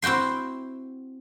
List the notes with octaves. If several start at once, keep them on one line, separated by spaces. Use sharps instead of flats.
C4 E4 F#4 G5 C6